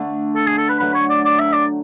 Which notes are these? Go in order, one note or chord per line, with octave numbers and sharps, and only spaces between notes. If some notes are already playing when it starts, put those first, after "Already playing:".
Already playing: D3 A3 D4
A4
G#4
A4
B4
D3 F#3 A3 B4
C#5
D5
D5
E5
D5